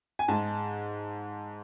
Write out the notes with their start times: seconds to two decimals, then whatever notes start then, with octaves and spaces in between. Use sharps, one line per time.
0.19 G#5
0.28 G#2 G#3 A5